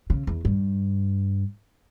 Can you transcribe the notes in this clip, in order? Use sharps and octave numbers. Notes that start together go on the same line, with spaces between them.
C#3
E2
G2